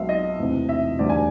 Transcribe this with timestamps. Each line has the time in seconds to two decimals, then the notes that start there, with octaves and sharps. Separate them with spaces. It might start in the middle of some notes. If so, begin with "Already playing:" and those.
Already playing: B1 B2 G#3 E5 F5
0.09 D#5
0.39 E1 D2 C3 E3
0.69 E5
0.99 E1 D2 D3 G3 D5
1.10 G#5